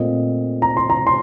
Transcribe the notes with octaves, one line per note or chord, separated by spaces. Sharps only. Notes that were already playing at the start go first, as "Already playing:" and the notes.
Already playing: A#2 A3 C4 D#5
A#5
C6
A#5
C6